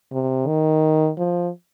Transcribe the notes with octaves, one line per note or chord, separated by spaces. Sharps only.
C3
D#3
F3